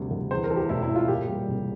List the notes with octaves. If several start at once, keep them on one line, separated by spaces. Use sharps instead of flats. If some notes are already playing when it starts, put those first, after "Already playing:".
Already playing: D2 C3 G3
D2
E2 C5
A#4
E3 A4
G4
E1 E4
E4
E1
F4
A#2 G4
G3
C2